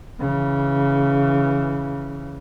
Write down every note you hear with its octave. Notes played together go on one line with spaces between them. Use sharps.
C#3 E3